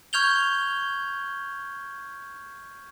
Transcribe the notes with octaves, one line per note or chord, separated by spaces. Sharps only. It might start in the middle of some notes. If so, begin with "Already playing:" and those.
C#6 F6 G6 G#6 F7 G7